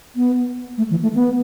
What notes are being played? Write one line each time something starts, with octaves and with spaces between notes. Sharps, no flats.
B3
A3
E3
A3
B3